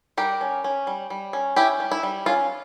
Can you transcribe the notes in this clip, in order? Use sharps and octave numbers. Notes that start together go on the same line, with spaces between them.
G3 G4 A#4
C#4
C#4
G3
G3
C#4
C#4 E4 G4
G3
E4
G3
C#4 F4